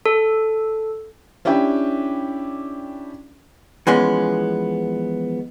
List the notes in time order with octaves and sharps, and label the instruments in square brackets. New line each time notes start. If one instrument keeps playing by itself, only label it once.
[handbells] A4
[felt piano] C#4 D4 E4 G4 G5
[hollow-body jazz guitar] E3 F3 G#3 B3 C#4